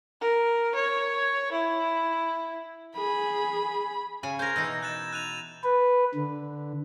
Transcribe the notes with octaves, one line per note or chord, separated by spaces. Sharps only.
A#4
C#5
E4
G#4 B5
C#3 G#5
A#4 C5 G6 G#6
B2 E3 D#4 E6 G6 G#6
F#6 A6 E7
F#6 D#7 F7
B4
D3